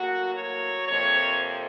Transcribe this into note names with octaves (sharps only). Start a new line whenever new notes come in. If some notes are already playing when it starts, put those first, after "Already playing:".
Already playing: A2 F#3 A#3 F#4
C#5
F2 C3 F3 A#3 C#5